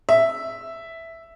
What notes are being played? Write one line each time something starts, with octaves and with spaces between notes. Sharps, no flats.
E5